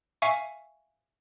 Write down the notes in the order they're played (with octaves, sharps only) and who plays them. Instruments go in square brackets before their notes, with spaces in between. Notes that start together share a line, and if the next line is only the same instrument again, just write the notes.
[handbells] E5 F5 G#5 C#6